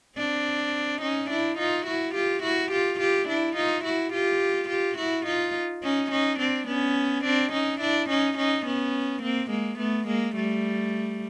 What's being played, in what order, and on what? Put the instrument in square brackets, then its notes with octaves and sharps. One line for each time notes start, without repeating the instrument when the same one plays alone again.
[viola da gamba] C4 D4
C#4 D#4
D4 E4
D#4 F4
E4 F#4
F4 G4
E4 F#4
F4 G4
F4 G4
D4 E4
D#4 F4
E4 F#4
F4 G4
F4 G4
E4 F#4
D#4 F4
C#4 D#4
C#4 D#4
C4 D4
B3 C#4
C4 D4
C#4 D#4
D4 E4
C#4 D#4
C#4 D#4
B3 C#4
A#3 C4
G#3 A#3
A3 B3
G#3 A#3
G3 A3